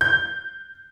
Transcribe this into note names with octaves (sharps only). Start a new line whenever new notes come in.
G6